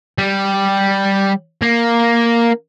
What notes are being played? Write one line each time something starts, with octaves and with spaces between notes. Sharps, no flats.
G3
A#3